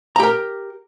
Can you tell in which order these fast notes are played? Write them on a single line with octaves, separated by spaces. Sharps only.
A#5 G4 A#4